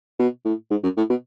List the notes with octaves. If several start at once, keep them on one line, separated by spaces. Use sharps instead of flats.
B2
A2
G#2
F#2
A2
B2